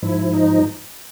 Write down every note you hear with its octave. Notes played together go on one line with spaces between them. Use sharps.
G#2 F3 E4
D#4